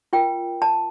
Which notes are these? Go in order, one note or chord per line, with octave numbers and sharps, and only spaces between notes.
F4 A#4 G5
A5